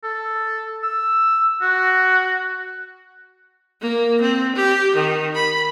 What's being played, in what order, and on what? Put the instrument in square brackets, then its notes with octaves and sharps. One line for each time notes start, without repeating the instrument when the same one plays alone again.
[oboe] A4
E6
F#4
[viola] A#3
C4
G4
D#3
B5